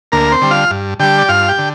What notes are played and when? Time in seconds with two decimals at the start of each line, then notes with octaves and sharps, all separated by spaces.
0.12 D2 A#3 A#4
0.32 C4 C5
0.42 D3 G3
0.51 F4 F5
0.70 G2
0.99 D3 G3 G4 G5
1.18 D5
1.29 G2 F4 F5
1.48 G4 G5
1.58 D3